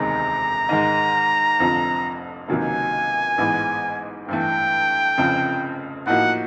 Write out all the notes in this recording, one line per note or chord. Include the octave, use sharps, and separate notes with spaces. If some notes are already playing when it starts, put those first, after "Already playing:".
Already playing: E1 D2 C3 D#3 G#3 A#5
G#2 D#3 G#3
F1 F2 D3 F3
C#2 C3 D#3 F#3 A#3 G#5
A1 G#2 E3 G#3 B3
G2 E3 A3 G5
F1 F2 C#3 F3
A2 F3 A#3 D#4 F#4 F#5